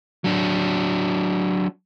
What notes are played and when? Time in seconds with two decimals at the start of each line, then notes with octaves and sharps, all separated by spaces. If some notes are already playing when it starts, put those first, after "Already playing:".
0.24 F#3 D4